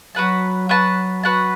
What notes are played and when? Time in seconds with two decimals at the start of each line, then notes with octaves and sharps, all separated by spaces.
0.15 F#3 F#4 B4 F#5 A5
0.69 F#4 B4 F#5 A5
1.23 F#4 B4 F#5 A5